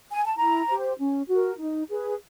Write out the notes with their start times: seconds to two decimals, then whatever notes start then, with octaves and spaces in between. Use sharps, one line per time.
0.12 G#5
0.26 A5
0.37 E4 A#5
0.69 G4 C5
0.98 C#4
1.28 F#4
1.34 A#4
1.59 D#4
1.90 G#4 B4